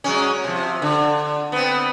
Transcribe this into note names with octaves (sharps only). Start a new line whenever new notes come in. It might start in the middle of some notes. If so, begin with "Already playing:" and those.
F#3 G#3 C#4
C3 F3
D3
B3 C4